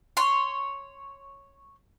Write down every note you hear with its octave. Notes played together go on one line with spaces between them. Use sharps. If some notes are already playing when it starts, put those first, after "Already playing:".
C#5 C6